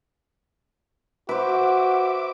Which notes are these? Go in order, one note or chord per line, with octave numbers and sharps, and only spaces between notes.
F#4 B4 C5 E5 D6